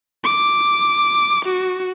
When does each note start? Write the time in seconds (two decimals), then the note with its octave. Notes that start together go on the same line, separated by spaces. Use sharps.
0.24 D6
1.45 F#4